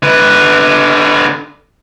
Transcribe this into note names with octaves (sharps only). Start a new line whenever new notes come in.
D3 B4